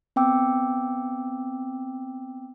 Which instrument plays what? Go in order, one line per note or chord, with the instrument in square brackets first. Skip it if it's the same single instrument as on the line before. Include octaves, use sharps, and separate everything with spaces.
[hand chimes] B3 C4 G5 D6 E6